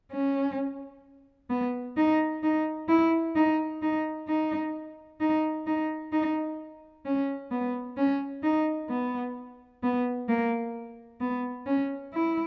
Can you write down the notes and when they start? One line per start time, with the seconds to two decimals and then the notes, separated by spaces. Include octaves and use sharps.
0.12 C#4
1.50 B3
1.97 D#4
2.43 D#4
2.89 E4
3.36 D#4
3.82 D#4
4.28 D#4
5.21 D#4
5.67 D#4
6.13 D#4
7.06 C#4
7.52 B3
7.97 C#4
8.43 D#4
8.90 B3
9.83 B3
10.29 A#3
11.21 B3
11.67 C#4
12.14 E4